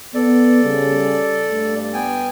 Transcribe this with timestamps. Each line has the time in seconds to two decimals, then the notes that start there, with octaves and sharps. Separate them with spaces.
0.15 B3 A4 D5
0.63 C#3 G3
1.52 G2 A3
1.94 B3 G5 G#5